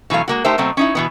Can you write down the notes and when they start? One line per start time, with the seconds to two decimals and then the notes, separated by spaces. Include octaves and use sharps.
0.10 B2 E3 F#3 A3 F5
0.28 G#3 A#3 F#4
0.44 A3 D#4 G4 A#4 C5 E5
0.58 B2 F#3 A3 C4
0.77 C#4 D#4 E4
0.95 B2 E3 B3